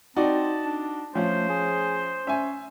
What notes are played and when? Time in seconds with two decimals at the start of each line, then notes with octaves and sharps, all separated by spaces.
0.16 C4 D#4 F#4 D5 A5
0.65 D4
1.15 F3 A3 C#4 F4 C5
1.49 G#4
2.27 C#4 E5 G#5